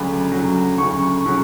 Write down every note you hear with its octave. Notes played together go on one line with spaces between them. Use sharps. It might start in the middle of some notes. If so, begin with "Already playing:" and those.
Already playing: D2 C#3 F#3 B5
D2 C#3 F#3
D2 C#3 F#3 C#6
C#3 F#3